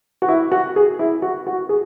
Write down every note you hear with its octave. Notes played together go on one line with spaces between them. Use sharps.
F#4
E4
F#4
G#4
E4
F#4
F#4
G#4